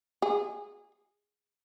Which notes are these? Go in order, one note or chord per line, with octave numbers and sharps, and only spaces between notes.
G#4